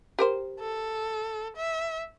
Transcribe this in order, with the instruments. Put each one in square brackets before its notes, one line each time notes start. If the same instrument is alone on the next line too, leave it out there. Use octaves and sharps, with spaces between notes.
[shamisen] G4 A#4 C5
[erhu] A4
E5